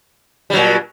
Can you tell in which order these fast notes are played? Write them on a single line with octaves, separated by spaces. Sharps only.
G3 F#3 A#2